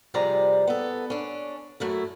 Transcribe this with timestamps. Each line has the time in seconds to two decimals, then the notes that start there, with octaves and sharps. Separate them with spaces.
0.14 F2 C3 G3 G#4 D5 A#5
0.67 B3 A4
1.10 C#4 D4
1.80 F#2 A3 E4